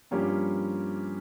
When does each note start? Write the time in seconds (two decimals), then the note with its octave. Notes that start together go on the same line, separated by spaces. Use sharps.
0.11 G2 F3 A#3 C#4 G4